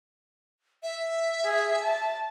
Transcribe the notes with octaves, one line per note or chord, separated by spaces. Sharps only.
E5
G#4
A5